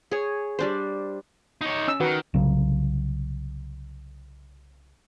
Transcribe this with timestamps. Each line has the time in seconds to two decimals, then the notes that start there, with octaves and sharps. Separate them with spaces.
0.11 G#4 C#5
0.59 G3 D4 C5
1.61 D#4 C#5
1.88 C#4 E6
2.00 D#3 F#4 B4 F#5
2.34 C2 C#3 F#3